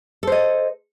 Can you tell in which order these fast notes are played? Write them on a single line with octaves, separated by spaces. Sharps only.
A4 C5 D#5